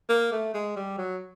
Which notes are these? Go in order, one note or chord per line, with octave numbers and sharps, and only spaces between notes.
A#3
A3
G#3
G3
F#3